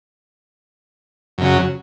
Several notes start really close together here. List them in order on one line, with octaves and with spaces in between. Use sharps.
F#2 C#3 F#3